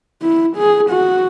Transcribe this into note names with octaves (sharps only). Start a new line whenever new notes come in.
E4
G#4
F#4